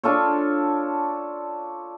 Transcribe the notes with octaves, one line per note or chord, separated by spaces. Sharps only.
D4 F4 A4 C#5